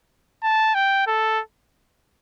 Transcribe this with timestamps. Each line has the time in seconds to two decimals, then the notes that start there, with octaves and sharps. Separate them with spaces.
0.43 A5
0.75 G5
1.07 A4